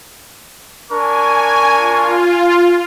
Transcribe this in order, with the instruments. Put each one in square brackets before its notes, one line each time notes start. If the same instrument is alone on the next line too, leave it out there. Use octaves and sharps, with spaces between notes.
[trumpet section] D4 A#4 C#6 [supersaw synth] G#5
[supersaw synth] F4